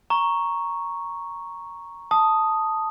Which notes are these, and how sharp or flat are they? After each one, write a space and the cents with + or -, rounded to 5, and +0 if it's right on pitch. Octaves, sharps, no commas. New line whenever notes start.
A#5 +0 C#6 +0
A5 +0 D#6 +0